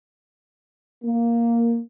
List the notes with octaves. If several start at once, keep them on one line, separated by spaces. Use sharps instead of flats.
A#3